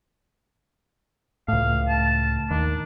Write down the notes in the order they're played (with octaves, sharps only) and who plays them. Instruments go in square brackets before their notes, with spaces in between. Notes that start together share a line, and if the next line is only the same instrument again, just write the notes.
[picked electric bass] C#2 A2 [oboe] F5
[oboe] A5
[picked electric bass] D#2 [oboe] D4